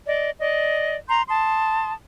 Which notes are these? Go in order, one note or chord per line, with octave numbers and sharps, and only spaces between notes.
D5 D#5
D5 D#5
A#5 C6 G6
A5 C6 D#6